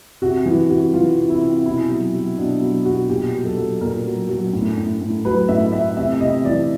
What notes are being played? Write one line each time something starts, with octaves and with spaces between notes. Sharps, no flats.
C3 F#4
E3
C3 F#4
E3 F4
C3
E4
C3
B2 E4
F#3
F#3
B2 D4
F#3
B2 F#4
A#2 G4
F#3
A4
F#3
A#2 A#4
F#3
F#3
A2
A2
A2
F#3 B4
A2 E5
A2 E5
C3 E5
C3 D#5
E3 D5